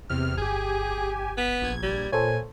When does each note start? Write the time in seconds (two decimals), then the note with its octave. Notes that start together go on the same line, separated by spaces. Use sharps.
0.10 E2 C3 F6
0.38 G1 G4 G#4 G#5
1.38 B3 B6
1.62 A#1 G#6
1.83 G3
2.12 A#2 A4 C5 C#5 G#5